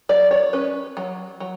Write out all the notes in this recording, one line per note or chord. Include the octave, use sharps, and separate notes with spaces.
F#3 D5
C#5
C#4 B4
F#3
F#3